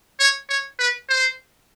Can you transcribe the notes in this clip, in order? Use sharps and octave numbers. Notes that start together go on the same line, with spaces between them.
C#5
C#5
B4
C5